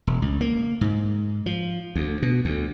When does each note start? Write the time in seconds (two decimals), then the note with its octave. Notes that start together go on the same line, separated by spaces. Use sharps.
0.07 E1
0.22 C#2
0.41 A#3
0.81 G#2
1.46 F3
1.96 D2
2.22 B2
2.45 D2